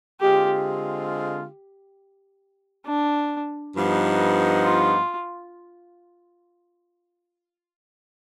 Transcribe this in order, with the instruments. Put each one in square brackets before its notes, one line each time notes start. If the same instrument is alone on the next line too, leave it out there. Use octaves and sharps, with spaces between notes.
[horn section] D3 G#3 C4 F4 [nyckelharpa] G4
[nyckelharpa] D4
[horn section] G2 F3 B3 D#4
[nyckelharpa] F4